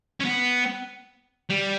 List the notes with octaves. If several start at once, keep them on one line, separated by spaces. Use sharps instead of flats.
C#4
B3
G3